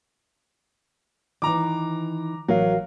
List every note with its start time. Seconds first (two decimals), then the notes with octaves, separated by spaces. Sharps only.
1.42 D#3 E3 A#5 D6
2.48 A1 F#3 A#4 F5